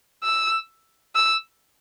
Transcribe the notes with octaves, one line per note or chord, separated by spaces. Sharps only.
E6
E6